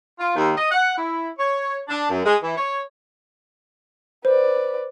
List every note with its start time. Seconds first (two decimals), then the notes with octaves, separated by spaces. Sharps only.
0.19 F4
0.36 D#2
0.56 D#5
0.71 F#5
0.96 E4
1.39 C#5
1.88 D4
2.09 F#2
2.25 G#3
2.42 E3
2.57 C#5
4.25 B4 C5 D5